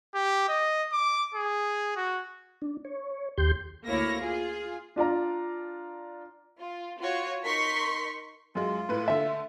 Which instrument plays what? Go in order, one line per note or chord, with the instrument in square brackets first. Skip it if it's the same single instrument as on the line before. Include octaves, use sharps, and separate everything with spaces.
[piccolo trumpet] G4
D#5
D6
G#4
F#4
[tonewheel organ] D4
C#5
D#2 G4 C6 G6
[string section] D2 A#3 E4 C#5 A#6
F4 G#4
[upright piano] D4 F4 D5 A#5
[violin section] F4
F4 F#4 C#5
D#4 A#4 C6 C#6 B6
[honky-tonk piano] F#2 G#3 [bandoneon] F4
[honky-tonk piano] A2 B4
[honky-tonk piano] D3 A3 [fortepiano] E5